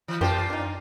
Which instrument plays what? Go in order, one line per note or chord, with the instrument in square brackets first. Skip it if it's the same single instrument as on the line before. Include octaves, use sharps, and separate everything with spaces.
[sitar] E3
[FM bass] F#2 [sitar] A#2 F4 [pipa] F3 G4 C5
[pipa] D4 D#4